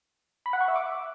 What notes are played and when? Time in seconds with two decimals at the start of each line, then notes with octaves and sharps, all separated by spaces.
0.46 B5
0.53 F#5
0.61 C#6
0.68 E5
0.76 D6